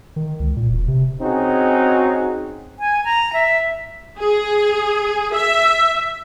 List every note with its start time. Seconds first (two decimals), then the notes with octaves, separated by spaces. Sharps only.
0.16 D#3
0.40 C#2
0.56 A#2
0.70 E1
0.88 C3
1.22 C4 C#4 D#4 F#4 G#4
2.79 G#5
3.04 A#5
3.33 E5
4.19 G#4
5.34 E5